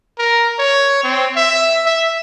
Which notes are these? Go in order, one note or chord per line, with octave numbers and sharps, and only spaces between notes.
A#4
C#5
C4
E5
E5